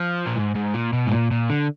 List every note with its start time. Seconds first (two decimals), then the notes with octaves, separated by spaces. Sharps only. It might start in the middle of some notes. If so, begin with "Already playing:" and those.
Already playing: F3
0.27 A#2
0.37 G#2
0.56 G#2
0.74 A#2
0.93 B2
1.07 G#2
1.12 A#2
1.31 A#2
1.50 D3